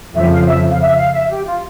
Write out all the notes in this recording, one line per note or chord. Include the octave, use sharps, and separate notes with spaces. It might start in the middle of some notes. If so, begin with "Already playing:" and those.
F2 C#3 F3 E5
F5
E5
F5
E5
F5
E5
G4
F4